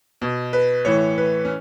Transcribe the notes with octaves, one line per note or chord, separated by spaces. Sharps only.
B2
B4
A2 E3 C#5
B4
C#4